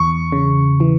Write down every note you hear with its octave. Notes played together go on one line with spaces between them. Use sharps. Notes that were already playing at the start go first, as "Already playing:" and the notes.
Already playing: E2 C#6
C#3
E3